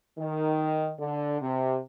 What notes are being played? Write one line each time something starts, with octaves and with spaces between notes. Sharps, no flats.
D#3
D3
C3